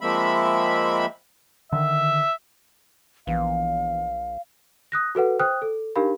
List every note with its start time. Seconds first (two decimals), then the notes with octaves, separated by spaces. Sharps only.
0.01 F3 G#3 A#3 C4 E5 B5
1.72 D3 D#3 E5
3.27 A#1 E3 B3 F5
4.92 D#6 F#6 A#6
5.15 F#4 A4 B4 F#5
5.39 C5 G5 D#6 F6 F#6
5.62 A4
5.96 D4 D#4 G4 A#4 F5 B5